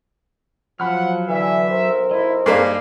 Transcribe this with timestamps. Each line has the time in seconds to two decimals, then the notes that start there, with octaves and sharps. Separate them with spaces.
0.80 F3 F#3 F#5 B5 F6
1.27 D3 E3 E5
1.71 B1 A#4 C5
2.11 E4 D#5
2.46 G2 A#3 D#4 G#4